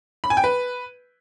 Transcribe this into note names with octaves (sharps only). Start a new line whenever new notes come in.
B5
G#5
G5
B4